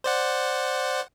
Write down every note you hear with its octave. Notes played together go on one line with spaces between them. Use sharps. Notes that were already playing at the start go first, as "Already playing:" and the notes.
C5 D5 F#5